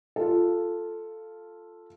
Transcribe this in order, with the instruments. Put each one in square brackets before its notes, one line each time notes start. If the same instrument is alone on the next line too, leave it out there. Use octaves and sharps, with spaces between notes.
[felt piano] F4 A4